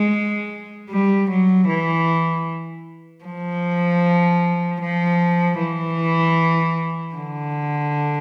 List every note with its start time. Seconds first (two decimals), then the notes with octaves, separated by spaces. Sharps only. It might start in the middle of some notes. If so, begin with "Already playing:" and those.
Already playing: G#3
0.90 G3
1.30 F#3
1.68 E3
3.24 F3
4.81 F3
5.59 E3
7.15 D3